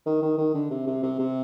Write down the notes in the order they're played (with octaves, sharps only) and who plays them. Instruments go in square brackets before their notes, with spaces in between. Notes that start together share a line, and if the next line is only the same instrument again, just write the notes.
[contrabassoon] D#3
D#3
D#3
D3
C3
C3
C3
C3